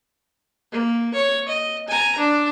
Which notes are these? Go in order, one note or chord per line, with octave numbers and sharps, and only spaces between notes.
A#3
C#5
D#5
G#5 A#5
D4